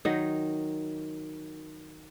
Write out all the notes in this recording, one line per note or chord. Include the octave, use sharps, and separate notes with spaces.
D#3 F#3 D#4